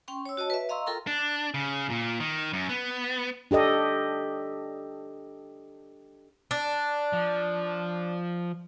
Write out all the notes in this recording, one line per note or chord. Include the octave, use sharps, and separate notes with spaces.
C#4 G5 C6 C#6
C#5 E6
F#4 C#5 D#5 A5
B4 E5
D#5 F5 A#5 C6 C#6 E6
F4 A4 A#4 G5 A#5
D4
C#3
A#2
D#3
F#2
B3
D4 G4 A4 D#5
D4
F3